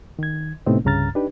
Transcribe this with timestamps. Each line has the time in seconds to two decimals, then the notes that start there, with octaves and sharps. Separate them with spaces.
0.19 D#3 G#6
0.66 A2 C3 A3 B3 C4 D#4
0.85 C2 G2 C#3 A#5 F6 A6
1.15 D4 D#4 G4 B4